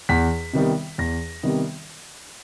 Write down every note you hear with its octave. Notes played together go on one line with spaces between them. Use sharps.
E2 B6
C3 D#3 G3 B3
E2 A#6
C3 D#3 G3 B3